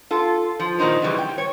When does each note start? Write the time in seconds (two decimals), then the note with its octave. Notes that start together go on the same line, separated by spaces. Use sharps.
0.11 F4 A4
0.60 F3
0.78 A#2 D#3 C#4 D#4 C5
1.02 C#3 E3 G3
1.19 G5
1.38 C#5